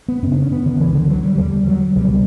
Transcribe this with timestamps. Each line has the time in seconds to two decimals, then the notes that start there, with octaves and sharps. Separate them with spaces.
0.08 B3
0.22 F#2 C#4
0.27 C#3
0.32 D4
0.42 C#4
0.52 B3
0.66 D3
0.80 C#2 C#3 E3
0.94 D3
1.09 F#3
1.23 G3
1.38 E2 D3 G3
1.67 F#3
1.95 C#2 B2 G3